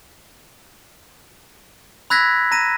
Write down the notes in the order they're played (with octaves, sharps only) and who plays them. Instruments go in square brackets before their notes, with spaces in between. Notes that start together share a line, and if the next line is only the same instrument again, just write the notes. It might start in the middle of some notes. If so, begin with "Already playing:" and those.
[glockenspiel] B5 E6 F#6 G#6 A#6 B6
A#5 A#6 D#7